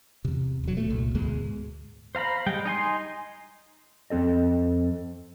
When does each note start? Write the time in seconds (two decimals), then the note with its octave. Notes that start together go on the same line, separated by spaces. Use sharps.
0.25 E2 C3
0.64 E1 F#3
0.77 B2 A3
0.90 C2 A#2
1.15 D2 G#2 B2 G#3
2.15 C5 F5 A#5 B5
2.46 G3 G#3 G5
2.66 D#4 G#5 C6
4.10 F2 C4 A4 D#5